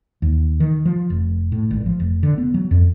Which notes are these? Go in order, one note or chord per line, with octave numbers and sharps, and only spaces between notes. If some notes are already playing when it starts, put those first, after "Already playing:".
D#2
D#3
F3
F1
A2
G#1
F3
F1
D3
B3
F#3
F2